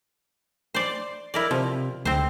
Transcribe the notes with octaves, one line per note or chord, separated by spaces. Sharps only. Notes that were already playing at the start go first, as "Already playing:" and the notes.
C5 D5
E4 A#4 D5
C3 F3
D2 C4 C5